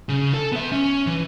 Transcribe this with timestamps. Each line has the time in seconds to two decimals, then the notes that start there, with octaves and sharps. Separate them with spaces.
0.09 C#3
0.34 A4
0.52 B3 E5
0.72 C#4
1.07 E3